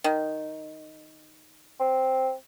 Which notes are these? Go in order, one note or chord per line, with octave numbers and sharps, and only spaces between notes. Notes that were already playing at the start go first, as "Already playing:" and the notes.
D#3
C4